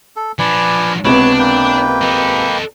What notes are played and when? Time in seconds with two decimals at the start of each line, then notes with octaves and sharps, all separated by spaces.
0.16 A4
0.39 F3 D4 B4 D5 G#5
1.05 C#2 C3 B3 D4 B4 C#5
1.39 A#3 B4 G5
2.02 A4 D#5